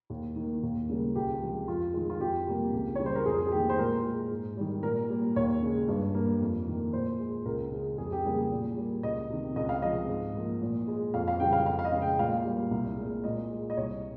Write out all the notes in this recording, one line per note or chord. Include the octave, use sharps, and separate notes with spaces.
D#2
D#3 A#3
D#2
C#3 G3 A#3
C#2 G4
C3 F3 G#3
F2 F4
D#3 G#3
F4
F2 G4
C3 G3 A#3
C#2
C#3 G3 C#5
C5
A#4
F2 G#4
G#4
D#3 A#3 G4
C5
A#2 A#4
G#3
G#2
D#3 G3
A#2 A#4
G3 A#3
D#2 C#5
C#3 G#3
G2
G3 A#3
F2
D#3 A#3
A#2 C5
G#3
C#2 A#4
C#3 G#3
F2 G#4
G4
C#3 G3 A#3 G#4
A#2
G3 A#3
C#2 D#5
C3 D#3
C#2 D#5
F5
C3 F3 G#3 D#5
G#2
F3 A#3
A#2
G#3
F2 F5
F5
C#3 G3 G5
F5
F2 F5
F5
D#5
C#3 G#3
G5
A#2 F5
G3 A#3
C2
A#2 G#3
A#2 D#5
G#3
D#5
C2 C#5